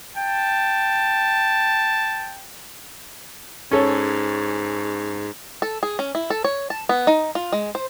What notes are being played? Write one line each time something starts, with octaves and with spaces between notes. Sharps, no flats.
G5 A5
G#2 C#4 A4 C#5
A4
G#4
C#4
E4
A4
C#5
A5
B3
D#4
F4
G#3
C5